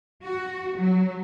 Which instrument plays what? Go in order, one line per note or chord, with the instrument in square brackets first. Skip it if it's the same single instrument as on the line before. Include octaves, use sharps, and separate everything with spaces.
[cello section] F#4
F#3